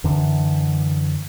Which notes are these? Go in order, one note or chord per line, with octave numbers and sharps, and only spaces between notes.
F#2 D3 E3